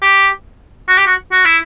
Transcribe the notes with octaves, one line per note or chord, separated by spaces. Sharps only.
G4
F#4
G4
F#4
F#4
E4